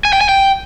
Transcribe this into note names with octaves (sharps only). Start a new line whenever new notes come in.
G#5
G5
G#5
G5